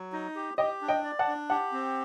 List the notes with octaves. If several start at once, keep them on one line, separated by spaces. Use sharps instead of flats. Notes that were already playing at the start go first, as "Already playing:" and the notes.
Already playing: F#3
D#4
G4
G4 D#5 G5
D4
D#5 G5
D5
F#5 A5
D4
G4 F#5 A5
C4